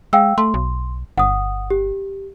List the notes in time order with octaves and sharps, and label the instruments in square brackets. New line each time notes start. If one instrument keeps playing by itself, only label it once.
[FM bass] G#3 [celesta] F5 G5 E6
[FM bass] A3 [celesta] C6
[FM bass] B1
[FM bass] G1 [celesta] F#5 D#6
[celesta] G4